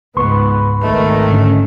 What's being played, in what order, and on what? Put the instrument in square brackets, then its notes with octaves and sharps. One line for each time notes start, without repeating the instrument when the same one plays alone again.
[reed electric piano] C#2 C6 C#6 [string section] G#2 B3 [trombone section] B4
[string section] G#1 D#3 [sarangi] A3
[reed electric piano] G#2 D3 C#4